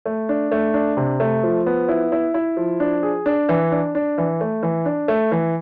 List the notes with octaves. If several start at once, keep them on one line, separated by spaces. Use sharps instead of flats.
A3
D4
A3
D4
C3
A3
F3
B3
E4
E4
E4
F3
D4
G#4
D4
E3
D4
D4
E3
A3
E3
D4
A3
E3